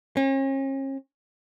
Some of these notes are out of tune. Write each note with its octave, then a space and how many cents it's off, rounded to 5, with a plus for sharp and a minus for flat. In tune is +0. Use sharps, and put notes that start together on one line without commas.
C#4 -40